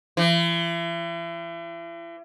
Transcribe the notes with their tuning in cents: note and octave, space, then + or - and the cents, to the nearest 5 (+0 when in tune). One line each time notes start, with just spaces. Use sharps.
E3 +40